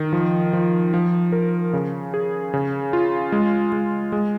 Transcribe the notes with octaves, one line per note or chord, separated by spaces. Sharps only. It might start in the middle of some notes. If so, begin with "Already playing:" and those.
Already playing: D#3
F3
F3
F3
A#4
C#3
G#4
C#3
F4
G#3
G#3
G#3